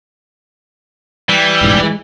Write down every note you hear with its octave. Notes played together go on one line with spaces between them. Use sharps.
E3 G3
E1 A1 G#2
G#3